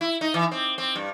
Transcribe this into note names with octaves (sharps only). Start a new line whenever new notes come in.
E4
D#4
E3
C4
C4
G2